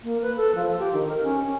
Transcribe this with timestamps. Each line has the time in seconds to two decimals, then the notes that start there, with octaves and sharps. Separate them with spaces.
0.04 A#3
0.22 B4
0.37 A4
0.55 F3
0.79 G4
0.93 D#3
1.08 A#4
1.23 C#4
1.42 C#4